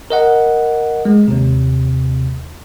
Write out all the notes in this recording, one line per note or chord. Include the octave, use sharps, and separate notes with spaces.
A#4 D#5 F#5
G#3
D#2 C3